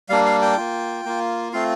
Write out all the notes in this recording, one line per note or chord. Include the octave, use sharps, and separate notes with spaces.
G3 A#3 D4 F5
F5
G5
A#3 F4
A#3 F4
A3 C4 F4 F5